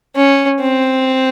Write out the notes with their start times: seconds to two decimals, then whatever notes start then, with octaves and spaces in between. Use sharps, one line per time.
0.16 C#4
0.61 C4